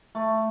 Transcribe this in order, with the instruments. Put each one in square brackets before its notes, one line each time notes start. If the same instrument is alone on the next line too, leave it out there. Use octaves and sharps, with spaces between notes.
[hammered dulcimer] A3